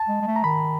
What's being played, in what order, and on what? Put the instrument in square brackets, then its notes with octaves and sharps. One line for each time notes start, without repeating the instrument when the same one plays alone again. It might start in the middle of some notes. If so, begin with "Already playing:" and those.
Already playing: [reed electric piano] A5
[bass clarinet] G#3
G#3
A3
[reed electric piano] A#5
[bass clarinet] D#3 [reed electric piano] B5